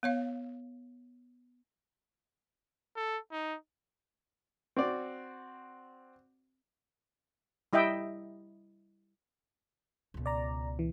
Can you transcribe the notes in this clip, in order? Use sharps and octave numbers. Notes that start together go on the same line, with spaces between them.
B3 C#5 F5
A4
D#4
C4 F#4 D5
G3 E4 D#5 E5 G5
C#2 B2
D5 A#5
E3